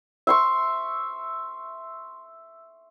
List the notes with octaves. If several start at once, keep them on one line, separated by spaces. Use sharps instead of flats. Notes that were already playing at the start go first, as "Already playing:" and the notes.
E5 C6 C#6